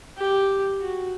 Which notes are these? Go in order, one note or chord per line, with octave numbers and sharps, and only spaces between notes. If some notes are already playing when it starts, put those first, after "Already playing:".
G4
F#4